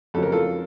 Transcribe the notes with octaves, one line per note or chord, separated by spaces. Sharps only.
F2 C#3 F#3 A4
A#4
F4 A4